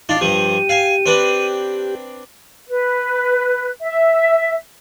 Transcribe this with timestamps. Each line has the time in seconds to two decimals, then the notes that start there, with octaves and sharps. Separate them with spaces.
0.09 D4 D#4 F4 A6
0.21 G2 F3 G4 D#7
0.69 F5 G#5
1.06 C4 D4 B4
2.69 B4
3.82 E5